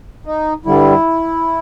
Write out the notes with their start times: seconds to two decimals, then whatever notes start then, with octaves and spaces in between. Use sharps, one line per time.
0.26 D#4
0.65 G2 D3 G3 E4